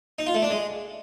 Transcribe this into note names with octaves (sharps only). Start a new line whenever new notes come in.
D#4
F4
A3
D4
G#3